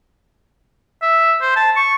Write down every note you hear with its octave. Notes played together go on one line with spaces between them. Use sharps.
E5
C5
A5
C#6